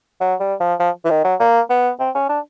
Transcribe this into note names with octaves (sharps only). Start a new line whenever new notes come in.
F#3
G3
F3
F3
E3
D#3
F#3
A#3
B3
C4
C#4
D4